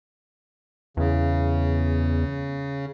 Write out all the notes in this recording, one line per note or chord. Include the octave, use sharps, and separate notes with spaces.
E2 C#3